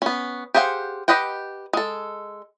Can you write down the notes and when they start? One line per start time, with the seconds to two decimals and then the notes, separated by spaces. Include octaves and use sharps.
0.02 B3 C#4
0.54 G4 G#4 C5 F5 F#5
1.08 G4 B4 D#5 F#5 G5
1.73 G#3 A4